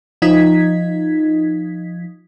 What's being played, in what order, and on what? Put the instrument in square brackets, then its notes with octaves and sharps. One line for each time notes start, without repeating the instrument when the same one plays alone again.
[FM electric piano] F3 D#4 G#6 B6